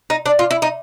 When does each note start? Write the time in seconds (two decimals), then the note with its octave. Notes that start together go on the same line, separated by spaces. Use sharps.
0.10 D#4
0.26 D4
0.39 F4
0.51 E4
0.62 D#4